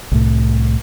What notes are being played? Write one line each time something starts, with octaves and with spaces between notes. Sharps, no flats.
C2 A2